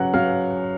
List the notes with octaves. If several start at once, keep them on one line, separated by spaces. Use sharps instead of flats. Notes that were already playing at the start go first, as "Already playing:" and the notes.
Already playing: C#3 F#3 F#5 F#6
F#3 F5 F6